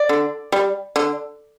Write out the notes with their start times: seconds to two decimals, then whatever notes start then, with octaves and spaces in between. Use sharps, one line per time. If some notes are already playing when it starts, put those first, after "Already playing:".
Already playing: D5
0.09 D3
0.52 G3
0.96 D3